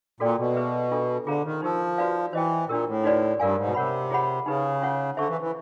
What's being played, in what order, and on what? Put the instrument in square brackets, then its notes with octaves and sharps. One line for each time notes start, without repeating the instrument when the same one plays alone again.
[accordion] A#2 [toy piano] F#4 A4 D5 G5
[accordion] B2
[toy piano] G#4 B4 E5
D4 F4 A4
[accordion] D3 [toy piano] F4 G#4 C5 F5 A#5
[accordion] D#3
[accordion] F3 [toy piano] D#4 G4 A#4
[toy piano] F#4 B4 D5 F5
[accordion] E3 [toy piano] C5 D#5 G5
[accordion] A#2 [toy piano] D4 G4 A#4
[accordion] A2
[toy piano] D#4 F#4 B4 D5
[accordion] G2 [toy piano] F4 A#4 D5 F5 G#5
[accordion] G#2
B2
[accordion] C3 [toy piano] A#4 C#5 F#5 B5
[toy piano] F4 G#4 C#5 F#5 B5
[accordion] C#3 [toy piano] D#4 G4 B4
[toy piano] C#4 F4 G#4 C#5 F#5
[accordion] D3 [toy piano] C5 E5 A5 C#6
[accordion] E3
E3